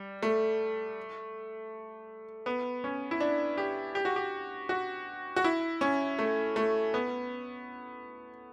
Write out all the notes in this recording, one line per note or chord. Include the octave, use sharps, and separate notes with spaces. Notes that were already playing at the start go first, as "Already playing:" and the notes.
Already playing: G3
A3
B3
C#4
E4
D4
G4
G4
F#4
G4
F#4
F#4
E4
C#4
A3
A3
B3